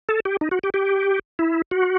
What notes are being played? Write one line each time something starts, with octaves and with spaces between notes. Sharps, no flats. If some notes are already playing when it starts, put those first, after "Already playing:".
A4
G4
D#4
F#4
G4
G4
E4
F#4